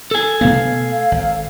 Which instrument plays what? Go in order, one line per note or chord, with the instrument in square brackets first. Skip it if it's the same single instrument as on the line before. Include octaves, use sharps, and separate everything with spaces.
[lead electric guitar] A4 G#5
[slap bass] B2 A3 B3 [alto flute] F5
[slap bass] G#1